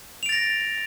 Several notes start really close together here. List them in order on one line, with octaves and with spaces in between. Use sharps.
F7 D7 A6 A#6